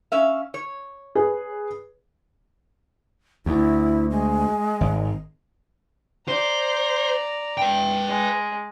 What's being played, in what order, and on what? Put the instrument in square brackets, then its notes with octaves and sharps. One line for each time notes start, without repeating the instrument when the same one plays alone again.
[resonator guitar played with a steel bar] C#4 E5 F5
C#5
[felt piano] G#4 B4
[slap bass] D2 [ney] E4
[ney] G#3
[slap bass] G#1
[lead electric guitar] C5 [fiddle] D5 A#5
[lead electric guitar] B4 G5
[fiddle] G#3